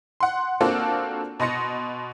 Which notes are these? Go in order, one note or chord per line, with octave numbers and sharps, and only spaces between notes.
F#5 C6
A#3 C4 D4 F4 F#4 A4
B2 D#5 C6 A#6 C#7